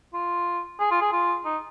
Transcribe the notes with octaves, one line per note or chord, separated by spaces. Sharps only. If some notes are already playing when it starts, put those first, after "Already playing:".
F4
G#4
F4
G#4
F4
D#4